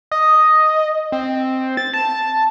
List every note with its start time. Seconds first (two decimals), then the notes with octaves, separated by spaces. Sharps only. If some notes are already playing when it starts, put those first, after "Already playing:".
0.11 D#5
1.12 C4
1.77 A6
1.94 A5